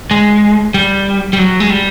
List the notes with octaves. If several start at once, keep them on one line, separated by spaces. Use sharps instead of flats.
G#3
G3
G3
F#3
G#3
G3